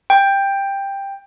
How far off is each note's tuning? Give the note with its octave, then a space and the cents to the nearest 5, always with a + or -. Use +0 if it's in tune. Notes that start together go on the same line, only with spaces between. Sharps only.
G5 +10